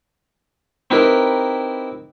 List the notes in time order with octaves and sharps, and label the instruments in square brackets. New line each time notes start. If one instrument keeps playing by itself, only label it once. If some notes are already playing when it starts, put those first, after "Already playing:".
[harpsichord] C4 D#4 E4 G4 A#4 B4